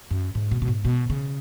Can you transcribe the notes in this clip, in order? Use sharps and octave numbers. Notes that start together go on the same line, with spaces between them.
F#2
G#2
B2
B2
G#2
B2
C#3